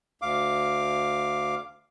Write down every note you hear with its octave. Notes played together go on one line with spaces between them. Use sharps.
D2 F5 D6